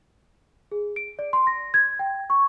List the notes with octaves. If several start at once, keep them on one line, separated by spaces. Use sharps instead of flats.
G#4
D7
D5
C6
A#6
G#6
G5
C#6